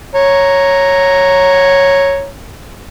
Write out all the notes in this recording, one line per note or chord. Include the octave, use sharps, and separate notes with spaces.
C#5 A#5